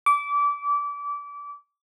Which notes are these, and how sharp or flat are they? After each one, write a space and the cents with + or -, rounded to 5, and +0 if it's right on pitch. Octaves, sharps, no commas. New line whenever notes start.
D6 -25